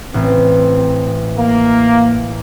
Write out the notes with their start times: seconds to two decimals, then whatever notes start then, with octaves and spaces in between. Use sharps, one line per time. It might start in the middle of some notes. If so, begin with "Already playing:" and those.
0.14 A1 C4
1.37 A#3